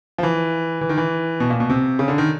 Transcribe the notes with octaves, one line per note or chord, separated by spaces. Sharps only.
F3
E3
E3
D#3
E3
B2
A#2
B2
C3
C#3
D3
D#3